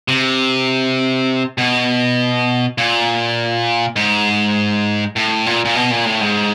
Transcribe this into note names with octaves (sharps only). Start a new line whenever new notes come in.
C3
B2
A#2
G#2
A2
A#2
A#2
B2
A#2
A2
G#2